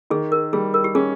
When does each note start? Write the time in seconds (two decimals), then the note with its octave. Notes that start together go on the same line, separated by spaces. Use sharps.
0.10 D#3 G#4
0.32 A#4
0.53 G3 G#4
0.74 A#4
0.84 G4
0.95 C#4 G#4